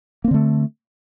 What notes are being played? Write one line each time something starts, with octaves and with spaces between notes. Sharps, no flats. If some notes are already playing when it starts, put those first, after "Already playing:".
D3 A3 A#3 C4